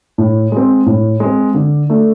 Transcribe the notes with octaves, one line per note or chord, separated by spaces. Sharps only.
A2
G#3 C4
A2
G#3
C4
D3
A3 D4 A4